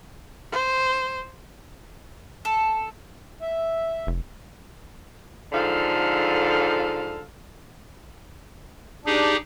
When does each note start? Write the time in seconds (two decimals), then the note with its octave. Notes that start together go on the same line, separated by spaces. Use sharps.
0.52 C5
2.45 A4
3.42 E5
4.07 F1
5.52 G#2 D3 F3 A4 F5
9.06 D4 D#4 G4 G#4